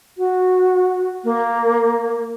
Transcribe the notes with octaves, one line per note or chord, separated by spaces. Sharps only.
F#4
A#3